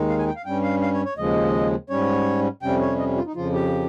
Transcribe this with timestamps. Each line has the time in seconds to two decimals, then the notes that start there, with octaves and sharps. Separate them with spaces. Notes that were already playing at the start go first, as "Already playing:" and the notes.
Already playing: D#2 D#3 G#3 D#4
0.09 F5
0.18 G#5
0.27 G5
0.36 F5
0.45 G2 G3 C#4 G5
0.63 F5
0.81 F5
0.93 C#5
1.05 C#5
1.17 D#2 C#3 F3 G#3 D#5
1.89 G#2 G3 C#4 C#5
2.62 F2 C3 G3 C#4 G5
2.81 C#5
2.98 D#5
3.16 F4
3.26 D#4
3.35 F2 C#3 F3 F4
3.53 G4